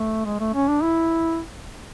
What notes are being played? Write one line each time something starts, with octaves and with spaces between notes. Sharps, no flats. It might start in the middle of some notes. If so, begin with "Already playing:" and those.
Already playing: A3
G#3
A3
C#4
D4
E4